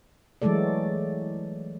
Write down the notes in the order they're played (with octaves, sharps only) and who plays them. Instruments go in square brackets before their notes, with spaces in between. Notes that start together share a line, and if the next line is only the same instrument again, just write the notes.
[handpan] E3 F#3 G#3 A3 A4 D5